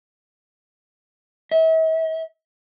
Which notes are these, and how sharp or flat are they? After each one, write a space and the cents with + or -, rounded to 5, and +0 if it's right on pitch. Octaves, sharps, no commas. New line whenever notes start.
E5 -40